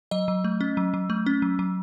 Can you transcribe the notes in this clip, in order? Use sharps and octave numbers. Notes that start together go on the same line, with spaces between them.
F#3 D#5
F#3
A3
C#4
F#3
F#3
A3
C#4
F#3
F#3